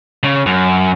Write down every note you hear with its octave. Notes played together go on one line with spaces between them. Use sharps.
C#3
F#2